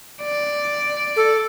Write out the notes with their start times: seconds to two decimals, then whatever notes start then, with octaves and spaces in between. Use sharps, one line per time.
0.23 D5
1.16 A4